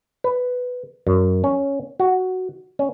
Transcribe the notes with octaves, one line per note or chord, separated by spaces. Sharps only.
B4
F#2
C#4
F#4
C#4